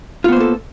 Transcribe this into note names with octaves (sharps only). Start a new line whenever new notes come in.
A#3 B3 F4 A4 C5